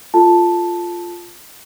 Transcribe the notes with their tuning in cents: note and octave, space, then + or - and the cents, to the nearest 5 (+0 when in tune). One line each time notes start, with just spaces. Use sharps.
F4 +0 A4 +0 A5 +0